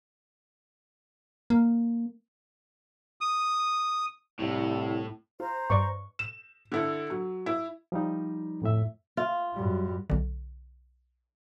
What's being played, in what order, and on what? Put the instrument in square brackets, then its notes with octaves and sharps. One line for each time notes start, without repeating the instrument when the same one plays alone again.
[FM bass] A#3
[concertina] D#6
[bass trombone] C2 [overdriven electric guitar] A2
[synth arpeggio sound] F4 [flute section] C5 A#5
[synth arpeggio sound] G2 B4 D5 [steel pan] C#6
[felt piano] E7
D3 E4 A4
F#3
E4
[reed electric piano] F3 G3 D#4
F2 A2 E5
[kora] F4
[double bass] F#2 G3
[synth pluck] B1 D3